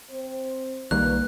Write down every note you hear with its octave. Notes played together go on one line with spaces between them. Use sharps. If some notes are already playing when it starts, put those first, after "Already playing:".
C4 C5
B1 D#3 G3 A#3 B4 F#6